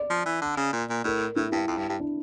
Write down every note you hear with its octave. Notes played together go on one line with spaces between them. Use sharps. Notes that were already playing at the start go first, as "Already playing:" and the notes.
Already playing: D5
F3
E3
D3
C#3
A#2
A#2
A2 A#4
A2 E4
G2 E4
F2
G2
G2
D4